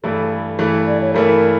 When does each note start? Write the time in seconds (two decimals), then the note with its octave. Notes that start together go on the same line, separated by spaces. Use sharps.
0.03 G2 E3 A3 E4 A4
0.59 G2 E3 A3 E4
0.87 D5
1.01 C#5
1.14 G2 E3 A3 E4 A#4